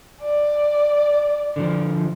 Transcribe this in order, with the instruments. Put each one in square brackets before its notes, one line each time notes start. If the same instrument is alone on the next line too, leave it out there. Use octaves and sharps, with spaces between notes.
[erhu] D5
[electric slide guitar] D3 D#3 F3